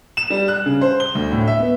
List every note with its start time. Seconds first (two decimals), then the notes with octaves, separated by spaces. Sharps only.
0.17 E7
0.30 G3
0.48 F#6
0.66 C#3
0.81 C5
1.00 G7
1.15 D2
1.32 A2
1.48 E5
1.60 B3